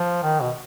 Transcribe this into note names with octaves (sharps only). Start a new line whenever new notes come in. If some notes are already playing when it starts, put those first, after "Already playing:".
Already playing: F3
D#3
B2